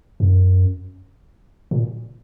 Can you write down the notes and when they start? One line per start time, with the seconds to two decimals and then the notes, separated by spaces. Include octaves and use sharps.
0.20 F#2
1.71 A#2